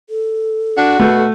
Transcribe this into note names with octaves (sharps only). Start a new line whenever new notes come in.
A4
D4 F#4
B2 A3